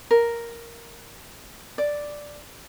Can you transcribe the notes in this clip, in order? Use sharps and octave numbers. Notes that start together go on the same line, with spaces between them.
A#4
D5